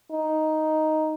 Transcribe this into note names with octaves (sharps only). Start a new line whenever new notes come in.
D#4